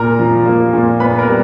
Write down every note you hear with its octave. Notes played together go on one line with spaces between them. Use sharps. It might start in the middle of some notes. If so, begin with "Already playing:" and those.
Already playing: A#2 A#4 A#5
F3
A#3
A#2
B3 B4 B5
A#4 A#5
G3